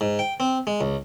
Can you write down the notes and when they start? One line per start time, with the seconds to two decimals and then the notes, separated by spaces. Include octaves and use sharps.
0.01 G#2
0.19 G5
0.40 C4
0.67 G#3
0.81 C#2